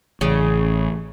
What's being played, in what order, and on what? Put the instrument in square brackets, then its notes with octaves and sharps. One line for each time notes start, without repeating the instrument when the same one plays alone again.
[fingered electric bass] A1 [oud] C#3